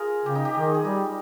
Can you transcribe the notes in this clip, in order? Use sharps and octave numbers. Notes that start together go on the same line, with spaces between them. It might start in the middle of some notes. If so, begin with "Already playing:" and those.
Already playing: F4 G#4 A#4
C#3 G4
D#4
G4
D#3 G#4
G#4
G3 G4